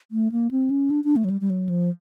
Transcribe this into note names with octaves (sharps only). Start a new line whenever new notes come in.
A3
A#3
C4
C#4
D4
D4
A3
F#3
G3
G3
F#3
F3